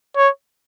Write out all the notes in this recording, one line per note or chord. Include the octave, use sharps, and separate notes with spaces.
C#5